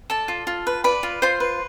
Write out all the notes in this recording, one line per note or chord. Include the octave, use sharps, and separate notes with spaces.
A4 D5 A5
F4
F4
B4
B4 D5 B5
F4
F4 C5 C6
B4